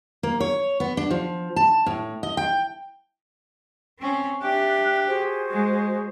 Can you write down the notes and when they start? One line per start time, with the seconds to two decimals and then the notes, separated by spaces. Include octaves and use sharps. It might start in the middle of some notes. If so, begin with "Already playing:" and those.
0.23 A#3
0.40 C#5
0.80 B3
0.97 D4
1.10 F3
1.56 A5
1.86 A2
2.23 D#5
2.37 G5
3.99 C4 C#4
4.42 D4 G4 E5 F#6
5.07 F#4 G#4 C5
5.50 G#3